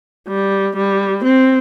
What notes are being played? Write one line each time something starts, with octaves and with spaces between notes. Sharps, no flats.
G3
G3
C4